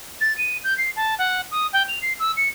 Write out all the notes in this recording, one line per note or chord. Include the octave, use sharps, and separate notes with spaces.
A6
D#7
G6
C7
A5
F#5
D#6
G5
F7
C7
E6
C#7